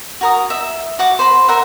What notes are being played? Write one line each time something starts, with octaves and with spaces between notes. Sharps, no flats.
F#4 A#4 D#6
E5
F#4 F#5 D6
C5 B5
A#4 C5 E5 F#5